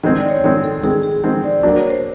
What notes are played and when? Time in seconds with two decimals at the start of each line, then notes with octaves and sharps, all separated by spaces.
0.03 D#3 G#3 C4 D#5
0.17 D5
0.30 C#5
0.44 D#3 G#3 C4 C#5
0.64 A4
0.83 D#3 G#3 C4 G#4
1.03 G#4
1.24 D#3 G#3 C4 C5
1.44 D5
1.63 F#3 A#3 D4
1.77 C#5
1.90 C5